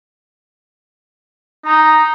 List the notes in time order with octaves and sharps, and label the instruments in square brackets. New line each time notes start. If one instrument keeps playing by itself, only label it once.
[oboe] D#4 [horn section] A#5